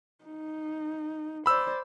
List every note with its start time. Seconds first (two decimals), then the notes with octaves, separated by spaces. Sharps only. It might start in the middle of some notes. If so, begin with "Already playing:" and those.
0.25 D#4
1.46 C5 D5 B5 E6